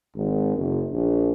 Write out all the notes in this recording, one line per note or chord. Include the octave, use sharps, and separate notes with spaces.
G#1
F#1
A#1